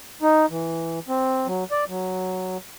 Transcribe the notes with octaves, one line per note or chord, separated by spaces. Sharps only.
D#4
E3
C4
F#3
D5
F#3